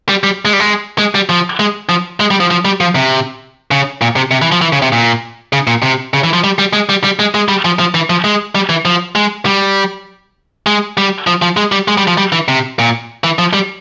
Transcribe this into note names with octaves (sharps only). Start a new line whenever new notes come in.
G3
G3
G#3
G3
G#3
G#3
G3
F3
G#3
F3
G#3
G3
F3
F3
G3
F3
C3
C#3
A#2
C3
C3
E3
F3
E3
C#3
C3
A#2
C#3
A#2
C3
C#3
E3
F3
G3
G3
G#3
G3
G3
G#3
G#3
G3
F3
F3
E3
F3
G#3
G3
E3
F3
G#3
G3
G#3
G3
F3
F3
G#3
G3
G#3
G3
F3
G3
E3
C3
A#2
E3
F3
G3